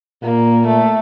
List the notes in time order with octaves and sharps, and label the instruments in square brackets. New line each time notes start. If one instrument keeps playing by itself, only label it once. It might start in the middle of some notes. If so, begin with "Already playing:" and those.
[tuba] A#2 [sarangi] A#3
[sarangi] A3